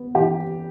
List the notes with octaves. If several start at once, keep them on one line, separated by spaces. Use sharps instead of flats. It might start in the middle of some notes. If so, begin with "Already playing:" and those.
Already playing: B3
E3 G4